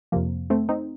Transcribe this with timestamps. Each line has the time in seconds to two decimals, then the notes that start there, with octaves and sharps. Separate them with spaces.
0.12 F2 C3 F3 A#3
0.50 A3 C4
0.69 C4 D#4